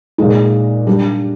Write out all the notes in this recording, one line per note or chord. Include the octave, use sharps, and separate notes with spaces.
A#2 G#3 D#4
G3 D4 G4